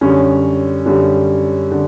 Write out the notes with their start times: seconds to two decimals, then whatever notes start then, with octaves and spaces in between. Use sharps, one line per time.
0.01 F#2 D3 G3 C#4
0.86 F#2 D3 G3
1.72 D3